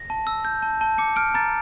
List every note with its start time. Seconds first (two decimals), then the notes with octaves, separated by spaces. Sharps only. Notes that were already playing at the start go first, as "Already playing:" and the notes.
Already playing: A#6
0.10 A5
0.27 E6
0.45 G6
0.62 A5
0.81 A5
0.98 D6 C#7
1.16 F6 D7
1.34 A#5 A6